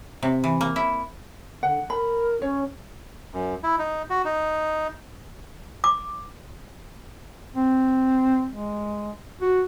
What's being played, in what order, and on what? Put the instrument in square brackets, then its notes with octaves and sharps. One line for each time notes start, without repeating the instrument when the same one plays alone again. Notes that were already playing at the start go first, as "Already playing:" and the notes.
[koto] C3
E3
A#3
E4
[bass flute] D3 [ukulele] F#5
[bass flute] A#4 [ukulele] B5
[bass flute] C#4 [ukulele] C#5
[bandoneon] F#2
E4
D#4
F#4
D#4
[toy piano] D6
[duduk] C4
G#3
F#4